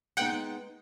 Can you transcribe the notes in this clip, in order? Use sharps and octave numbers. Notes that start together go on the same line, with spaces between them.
G#3 B3 D#4 F#5 G5